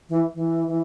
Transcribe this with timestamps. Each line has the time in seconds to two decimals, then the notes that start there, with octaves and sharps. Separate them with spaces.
0.09 E3
0.34 E3
0.67 E3